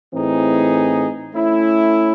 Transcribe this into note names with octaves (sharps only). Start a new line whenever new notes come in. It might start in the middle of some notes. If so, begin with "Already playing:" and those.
A2 E3 C4 D#4 G#4
A3 C#4 E4